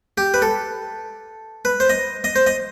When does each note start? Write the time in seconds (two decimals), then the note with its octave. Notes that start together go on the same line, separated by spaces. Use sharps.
0.18 G4
0.34 B4
0.42 A4
1.65 B4
1.80 C5
1.89 D#5
2.24 D#5
2.36 C5
2.47 D#5